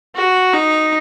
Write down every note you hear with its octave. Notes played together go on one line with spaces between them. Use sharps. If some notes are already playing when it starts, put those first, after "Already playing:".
F#4
D#4